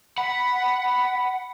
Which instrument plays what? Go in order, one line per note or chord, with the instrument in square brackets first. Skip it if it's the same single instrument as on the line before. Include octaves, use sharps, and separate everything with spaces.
[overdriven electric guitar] F#5 [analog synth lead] B5